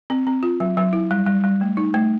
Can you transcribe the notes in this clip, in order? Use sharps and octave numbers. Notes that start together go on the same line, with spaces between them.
C4
C4
F4
F#3
F#3
E4
G3
G3
G3
A3
D#4
A3